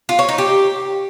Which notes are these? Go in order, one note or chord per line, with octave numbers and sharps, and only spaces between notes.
F4
C#5
D#4
G4